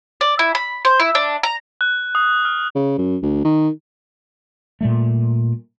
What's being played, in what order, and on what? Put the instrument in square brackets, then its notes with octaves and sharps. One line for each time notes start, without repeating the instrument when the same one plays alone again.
[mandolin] D5
E4
B5
C5
E4
D4
A#5
[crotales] F#6
D#6
F6
[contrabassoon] C#3
F#2
D2
D#3
[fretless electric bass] A#2 G3 A3